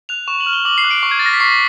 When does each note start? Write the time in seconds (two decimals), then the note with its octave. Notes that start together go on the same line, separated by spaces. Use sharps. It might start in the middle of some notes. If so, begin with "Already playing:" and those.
0.09 F#6 F7
0.28 C#6 E7
0.40 F#7
0.46 F6
0.53 G7
0.65 D6 F#7
0.78 C7
0.84 F#6
0.91 D7
1.03 C#6
1.11 G#6
1.19 A6
1.22 F6 A#6
1.34 B6
1.40 C#6 C7